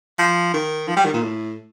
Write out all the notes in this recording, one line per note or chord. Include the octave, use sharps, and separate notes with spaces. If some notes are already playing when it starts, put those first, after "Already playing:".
F3
D#3
F3
G3
D#3
A#2
A2